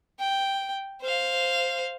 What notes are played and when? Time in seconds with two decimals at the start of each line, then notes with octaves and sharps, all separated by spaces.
0.20 G5
1.01 C5 F5